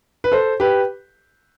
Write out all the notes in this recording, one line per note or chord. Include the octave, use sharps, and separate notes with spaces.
B4
A4 C5
G4 B4